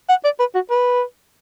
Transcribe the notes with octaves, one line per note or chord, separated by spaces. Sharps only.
F#5
D5
B4
F#4
B4